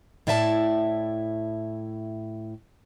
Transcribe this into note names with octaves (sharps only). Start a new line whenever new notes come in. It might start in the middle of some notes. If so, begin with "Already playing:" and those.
A2 E4 D5 E5 G#5 A5